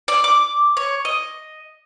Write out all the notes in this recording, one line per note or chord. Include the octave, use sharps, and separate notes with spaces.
D5
D6
C#5
D#5